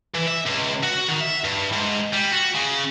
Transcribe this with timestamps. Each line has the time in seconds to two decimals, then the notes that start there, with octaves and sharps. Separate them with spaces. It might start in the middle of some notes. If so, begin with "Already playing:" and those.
0.14 E3
0.27 E5
0.46 C#2
0.83 F#4
1.08 D#3
1.20 E5
1.44 G2
1.72 G#2
2.13 G3
2.32 F#4
2.55 C#3